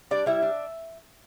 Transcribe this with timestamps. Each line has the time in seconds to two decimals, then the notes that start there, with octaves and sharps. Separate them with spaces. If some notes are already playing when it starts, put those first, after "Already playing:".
0.11 G3 D4 D5
0.26 G3 E4 E5
0.42 D4